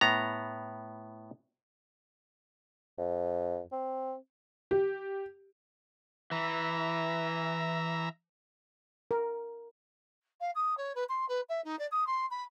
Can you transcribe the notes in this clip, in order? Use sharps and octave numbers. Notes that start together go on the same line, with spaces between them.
A2 B3 A#5
F2
C4
G4
E3 E5 A#5
A#4
F5
D#6
C#5
B4
C6
B4
E5
D#4
D5
D#6
C6
B5